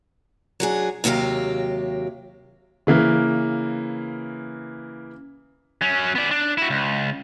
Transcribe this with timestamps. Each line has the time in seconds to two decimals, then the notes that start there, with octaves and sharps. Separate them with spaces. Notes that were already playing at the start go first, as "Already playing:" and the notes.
0.60 F#3 D4 G#4
1.04 D#2 C3 F#3 G4 F5
2.87 C#3 E3 A#3
5.81 F#3 C#4
6.15 B3 D5
6.31 D4
6.58 E4 F#4
6.70 C#2